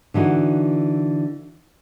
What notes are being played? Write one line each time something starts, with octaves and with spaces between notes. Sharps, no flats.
D3 E3 D#4 F#4